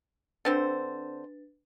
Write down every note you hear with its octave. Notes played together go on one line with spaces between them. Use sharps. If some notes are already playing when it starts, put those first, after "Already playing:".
D3 C4 D4 B4 C5 A6